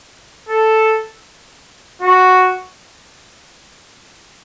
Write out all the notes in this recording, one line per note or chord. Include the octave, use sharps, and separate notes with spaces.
A4
F#4